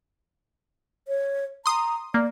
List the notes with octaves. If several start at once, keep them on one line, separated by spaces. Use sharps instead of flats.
C#5
A#5 C6 D#6
A#3 D5